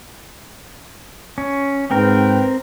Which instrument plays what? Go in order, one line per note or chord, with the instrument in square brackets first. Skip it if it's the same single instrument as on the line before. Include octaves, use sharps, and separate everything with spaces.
[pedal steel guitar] C#4
[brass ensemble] G#2 B4 G5 [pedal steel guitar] C4 A#4